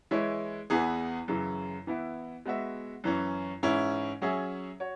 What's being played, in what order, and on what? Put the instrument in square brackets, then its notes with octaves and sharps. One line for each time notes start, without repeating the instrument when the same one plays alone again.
[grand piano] E3 G#3 E4 C#5
E2 E3 B3 G#4
F#2 C#3 E3
E3 B3 E4
G#3 B3 F#4 E5
F#2 E3 C#4
G#2 E3 C#4 E4
F#3 C#4 G#4 E5
F#4 C#5